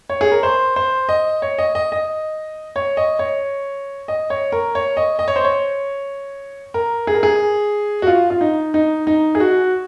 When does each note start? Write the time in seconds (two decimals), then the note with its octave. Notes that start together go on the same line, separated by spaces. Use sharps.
0.09 C#5
0.21 G#4
0.32 A#4
0.43 C5
0.76 C5
1.09 D#5
1.42 C#5
1.58 D#5
1.75 D#5
1.92 D#5
2.76 C#5
2.97 D#5
3.19 C#5
4.08 D#5
4.30 C#5
4.52 A#4
4.75 C#5
4.97 D#5
5.19 D#5
5.28 C#5
5.36 C5
5.44 C#5
6.74 A#4
7.07 G#4
7.15 A#4
7.23 G#4
8.02 F#4
8.07 F4
8.30 F4
8.41 D#4
8.74 D#4
9.07 D#4
9.35 G#4
9.40 F#4